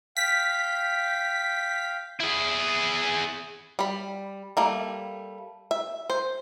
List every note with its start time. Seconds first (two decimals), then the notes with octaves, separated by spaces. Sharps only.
0.17 F5 G5 B6
2.20 E4 G#4
3.79 G3 B5
4.57 G3 A3 A#3
5.71 E5
6.10 C5